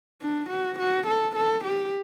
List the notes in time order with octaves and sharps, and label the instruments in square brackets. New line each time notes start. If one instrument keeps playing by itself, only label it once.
[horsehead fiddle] D4
F#4
F#4
A4
A4
G4